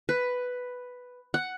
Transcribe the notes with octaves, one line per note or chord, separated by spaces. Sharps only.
B4
F#5